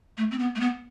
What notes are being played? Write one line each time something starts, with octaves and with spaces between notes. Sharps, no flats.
A3
C4
B3
A3
B3